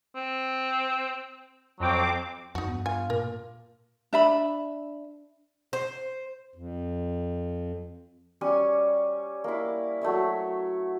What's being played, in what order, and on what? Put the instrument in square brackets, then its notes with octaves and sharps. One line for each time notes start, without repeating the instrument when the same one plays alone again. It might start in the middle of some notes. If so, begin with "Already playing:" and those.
[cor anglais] C4
[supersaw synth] F2 C4 D6 [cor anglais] F#3
[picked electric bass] F2 [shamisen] D#4 F#4
[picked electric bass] G2 B3
[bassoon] F4 [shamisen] G#5
[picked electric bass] A#2 [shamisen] A#4
[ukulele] D4 E5 B5
[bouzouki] C5
[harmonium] F2
[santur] G3 C#4 G#5 C#6
A#3 E4
F#3 A3 C#5 E5